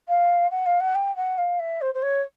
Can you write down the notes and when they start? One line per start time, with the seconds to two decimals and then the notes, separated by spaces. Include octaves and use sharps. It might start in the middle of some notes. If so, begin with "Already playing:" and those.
0.08 F5
0.51 F#5
0.66 F5
0.80 F#5
0.95 G5
1.16 F#5
1.38 F5
1.59 E5
1.81 C5
1.94 C5
2.02 C#5